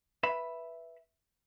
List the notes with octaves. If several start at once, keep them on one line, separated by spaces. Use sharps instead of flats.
B4 E5 B5